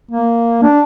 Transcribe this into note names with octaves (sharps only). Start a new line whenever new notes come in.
A#3
D4